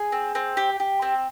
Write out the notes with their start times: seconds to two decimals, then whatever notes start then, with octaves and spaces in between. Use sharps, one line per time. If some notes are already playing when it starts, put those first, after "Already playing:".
Already playing: G#4 G#5
0.12 C4
0.35 C4
0.57 G4
0.80 G4
1.02 C4